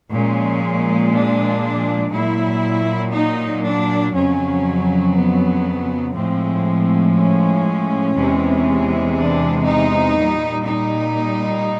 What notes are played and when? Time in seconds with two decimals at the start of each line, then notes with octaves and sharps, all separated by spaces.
0.11 A#2 F3 G#3 C#4
1.11 D4
2.12 A#2 F#3 E4
3.13 D#4
3.63 D4
4.13 F2 C#3 F#3 C#4
5.13 B3
6.14 A2 F3 G#3 C4
7.15 C#4
8.15 E2 C3 E3 G#3
9.17 D4
9.66 D#4
10.16 A#2 G3
10.67 D#4